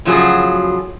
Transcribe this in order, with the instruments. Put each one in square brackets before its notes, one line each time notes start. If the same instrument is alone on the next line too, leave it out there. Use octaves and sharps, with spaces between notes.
[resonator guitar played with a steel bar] A2 C#3 F3 F#3 F#4 G#4